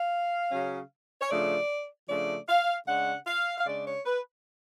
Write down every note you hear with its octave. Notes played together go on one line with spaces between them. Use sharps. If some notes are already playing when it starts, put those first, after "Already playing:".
Already playing: F5
C#3 F#3 C#4
C#5
C#3 F3 A3 D4 D5
C#3 F3 A3 D4 D5
F5
C#3 G#3 D4 F#5
F5
F5
C#3 G#3 D4 D5
C#5
B4